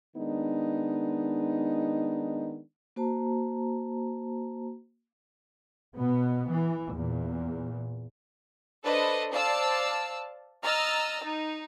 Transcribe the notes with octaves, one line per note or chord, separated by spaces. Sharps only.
D#3 G#3 B3 D4 D#4
A#3 F#4 C5 A5 A#5
B2 B3
E3
E2 A#2
D4 A4 B4 C5 D#5
C5 D5 F5 A5 E6
D#5 A#5 E6 F6 A6
D#4